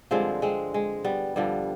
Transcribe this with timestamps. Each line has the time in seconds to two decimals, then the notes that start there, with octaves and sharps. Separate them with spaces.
0.11 G2 D3 F3 G#3 C4
0.42 G#3 C4
0.74 G#3
1.04 G3 B3
1.36 G2 D3 F3 G3